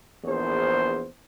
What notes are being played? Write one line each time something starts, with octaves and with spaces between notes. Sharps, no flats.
A#1 E2 C5